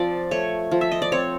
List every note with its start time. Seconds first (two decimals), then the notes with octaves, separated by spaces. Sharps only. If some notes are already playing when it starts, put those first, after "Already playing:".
Already playing: F3 C4 D5
0.31 A3 C#5
0.71 F3
0.81 E5
0.92 D#5
1.02 D5
1.12 C4 C#5